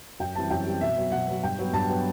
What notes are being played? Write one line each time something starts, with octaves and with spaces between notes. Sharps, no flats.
F#2 G5
E3 G3 C4 A5
F#2 G5
E3 G3 C4
B2 E5
F#3 B3
B2 F#5
F#3 B3
G2 G5
F#3 B3
G2 A5
F#3 B3